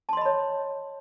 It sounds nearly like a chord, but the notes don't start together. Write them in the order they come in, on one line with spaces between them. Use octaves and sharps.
A5 C6 D#5 B5 C#5